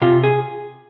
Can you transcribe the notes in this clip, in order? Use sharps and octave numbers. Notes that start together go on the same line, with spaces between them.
C3 F4
G#4